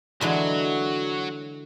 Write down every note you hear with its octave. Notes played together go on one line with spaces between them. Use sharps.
D3 E3 F#3 G#3 F#4